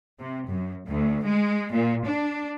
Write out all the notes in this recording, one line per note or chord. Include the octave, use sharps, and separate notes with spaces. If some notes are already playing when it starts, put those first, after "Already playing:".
C3
F#2
D2
G#3
A#2
D4